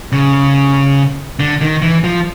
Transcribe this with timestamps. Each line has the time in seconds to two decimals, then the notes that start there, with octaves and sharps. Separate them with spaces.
0.13 C#3
1.39 D3
1.61 D#3
1.82 E3
2.04 F3